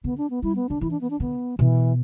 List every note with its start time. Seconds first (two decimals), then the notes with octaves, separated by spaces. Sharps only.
0.04 D3 B3
0.18 D4
0.30 B3
0.43 G3 E4
0.56 B3
0.69 D3 D4
0.81 E3 E4
0.91 D4
1.01 B3
1.10 D4
1.20 D3 B3
1.58 B2 E3